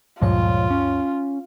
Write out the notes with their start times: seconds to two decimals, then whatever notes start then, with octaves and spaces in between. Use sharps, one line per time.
0.21 D2 G2 A#2 F3 G#3 F4 C#5
0.70 C#4